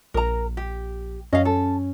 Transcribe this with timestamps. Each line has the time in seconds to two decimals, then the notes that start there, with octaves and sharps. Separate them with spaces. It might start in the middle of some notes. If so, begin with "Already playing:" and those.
0.14 A#1 A#4 A#5
0.57 G4
1.33 F#2 C#4 D#5 F5
1.45 A4